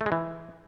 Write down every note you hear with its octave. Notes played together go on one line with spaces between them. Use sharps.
A3
G#3
E3